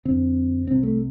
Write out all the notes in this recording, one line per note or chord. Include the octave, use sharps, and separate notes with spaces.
F2 D3 C4
C2 C3 C4
A3